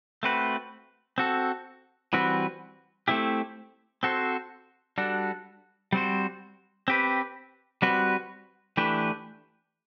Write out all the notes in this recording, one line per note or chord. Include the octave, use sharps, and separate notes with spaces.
A3 C4 F#4 B4
C4 F#4 A4
E3 G3 C4 F#4 B4
A3 C4 E4 G4
C4 F#4 A4 C5
G3 D4 F#4 A4
G3 C4 F#4 C5
C4 G4 B4
G3 C4 F#4 B4
E3 A3 D4 G4 B4